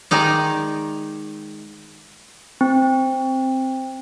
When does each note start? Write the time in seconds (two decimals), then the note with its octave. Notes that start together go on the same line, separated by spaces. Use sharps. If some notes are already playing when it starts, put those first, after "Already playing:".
0.11 D#3 G#3 D#4 D5
2.61 C4